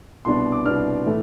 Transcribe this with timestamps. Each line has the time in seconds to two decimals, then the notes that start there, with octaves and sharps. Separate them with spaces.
0.25 C2 B2 B3 D4 C6
0.52 D6
0.66 C2 B2 B3 D4 F6
1.06 A2 E3 A3